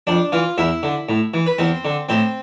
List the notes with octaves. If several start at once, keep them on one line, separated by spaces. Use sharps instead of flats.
F2 D4 D5
E3 F4 F5
E2 E4 E5
D3
A2
E3
B4
E2 C4 C5
D3
A2 C4 C5